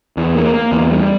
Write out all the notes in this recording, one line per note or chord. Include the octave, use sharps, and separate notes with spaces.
E2
A#3
A#3
E2
G3